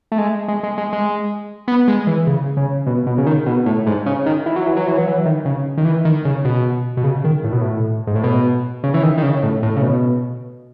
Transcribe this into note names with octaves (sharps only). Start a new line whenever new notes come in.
A3
G#3
G#3
G#3
G#3
G#3
B3
G#3
E3
C#3
C#3
B2
B2
C#3
D#3
B2
A2
G#2
C#3
D#3
E3
F#3
E3
F#3
E3
F#3
E3
D#3
C#3
D#3
E3
D#3
C#3
B2
B2
C#3
D#3
A2
B2
A2
G#2
A2
B2
C#3
E3
D#3
D#3
C#3
A2
A2
C#3
B2